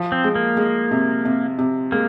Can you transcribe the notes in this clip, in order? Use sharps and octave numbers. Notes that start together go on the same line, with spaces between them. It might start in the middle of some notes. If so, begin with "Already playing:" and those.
Already playing: F3
C4
G#3
A#3
G#3
C3
C3
C3
G#3 A#3